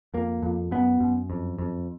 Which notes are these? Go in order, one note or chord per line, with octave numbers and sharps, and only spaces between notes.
F2 A#3
F2
F#2 B3
F#2
F2
F2